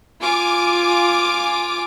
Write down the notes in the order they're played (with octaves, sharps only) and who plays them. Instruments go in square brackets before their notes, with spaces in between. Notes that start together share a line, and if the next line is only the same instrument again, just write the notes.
[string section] F4 G#5 D6